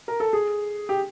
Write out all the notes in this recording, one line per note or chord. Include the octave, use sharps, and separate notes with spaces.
A#4
A4
G#4
G4